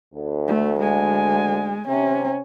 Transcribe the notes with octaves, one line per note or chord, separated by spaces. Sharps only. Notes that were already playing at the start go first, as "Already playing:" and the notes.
D2
A3
G#3 G#5
C3 C#4